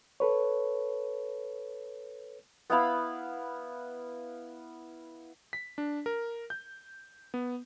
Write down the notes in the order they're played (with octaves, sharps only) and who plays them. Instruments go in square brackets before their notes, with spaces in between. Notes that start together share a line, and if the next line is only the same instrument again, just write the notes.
[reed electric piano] A4 B4 C#5
[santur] B3 E4 F5 B5
[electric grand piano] B6
D4
A#4
G6
B3